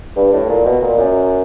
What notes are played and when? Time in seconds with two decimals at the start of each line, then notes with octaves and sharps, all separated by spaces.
0.16 G2
0.33 A2
0.49 A#2
0.65 B2
0.82 A#2
0.98 F#2